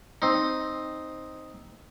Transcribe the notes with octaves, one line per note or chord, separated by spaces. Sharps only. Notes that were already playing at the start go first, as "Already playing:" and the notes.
C4 D#4